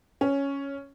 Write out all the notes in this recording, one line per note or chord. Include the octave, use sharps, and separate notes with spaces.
C#4